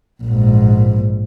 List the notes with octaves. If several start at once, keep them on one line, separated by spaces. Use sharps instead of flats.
A#1 G#2